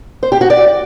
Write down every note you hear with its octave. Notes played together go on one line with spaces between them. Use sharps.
C5
G4
F#4
D5